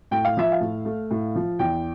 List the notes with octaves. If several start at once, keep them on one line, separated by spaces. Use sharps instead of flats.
A2 G5
F5
F3 E5
F5
A2
A3
A2
F3
E2 G5